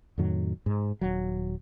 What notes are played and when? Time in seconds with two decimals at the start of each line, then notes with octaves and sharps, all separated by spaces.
0.18 F2 A2 D#3 F#3
0.66 G#2
1.01 D#1 F#3